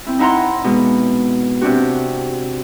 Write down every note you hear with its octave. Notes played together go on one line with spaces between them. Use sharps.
C4 E4
D#4 E4 F#5 A#5 C6
B2 G#3
C3 C4 D4 F#4